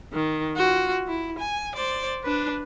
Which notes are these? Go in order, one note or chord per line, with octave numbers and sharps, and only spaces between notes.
D#3
F4 F#4
E4
G#5
C5 D5
D4 B4